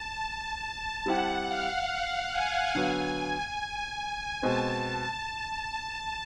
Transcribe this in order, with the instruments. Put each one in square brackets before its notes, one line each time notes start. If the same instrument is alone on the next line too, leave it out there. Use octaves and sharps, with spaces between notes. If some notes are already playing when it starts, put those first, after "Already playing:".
Already playing: [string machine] A5
[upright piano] G3 C4 E4 G4 [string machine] F#5
[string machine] F5
F#5
G#5
[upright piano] D3 F#3 B3
[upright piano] B2 G#3 C4 [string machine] A5